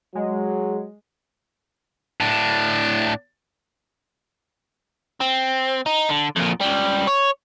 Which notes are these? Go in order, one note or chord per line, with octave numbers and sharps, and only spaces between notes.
F#3 G#3
A2 D4
C4
D#4
D3
F2 A#2
C#2 G3
C#5